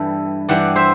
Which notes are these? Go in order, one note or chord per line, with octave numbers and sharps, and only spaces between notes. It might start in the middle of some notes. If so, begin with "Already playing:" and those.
Already playing: G2 E3 G3 A4
G2 E3 G3 D5 F#5
C5 E5